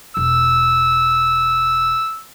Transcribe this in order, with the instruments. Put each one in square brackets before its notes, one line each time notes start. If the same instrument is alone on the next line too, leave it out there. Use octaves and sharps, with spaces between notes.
[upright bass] E1 [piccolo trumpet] E6